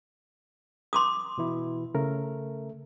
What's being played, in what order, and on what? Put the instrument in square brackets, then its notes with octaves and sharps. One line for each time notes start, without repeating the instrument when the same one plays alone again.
[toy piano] C6 D6 D#6
[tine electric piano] B2 E3 E4
[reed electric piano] C#3 A#4 [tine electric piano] A3